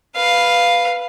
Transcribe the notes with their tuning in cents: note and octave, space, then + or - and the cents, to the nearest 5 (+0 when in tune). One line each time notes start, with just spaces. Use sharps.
B4 +0 F5 +0